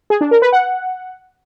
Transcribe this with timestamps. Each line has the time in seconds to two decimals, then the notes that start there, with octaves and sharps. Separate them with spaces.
0.10 G#4
0.21 D4
0.31 A#4
0.42 B4
0.52 F#5